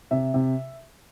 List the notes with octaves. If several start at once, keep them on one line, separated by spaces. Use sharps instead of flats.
C3 E5
C3